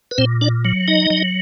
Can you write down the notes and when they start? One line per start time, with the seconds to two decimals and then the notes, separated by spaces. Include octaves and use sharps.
0.11 B4
0.18 A#2 C4 C5
0.41 D4 D5
0.65 F#3
0.88 D#4 D#5
1.10 F#3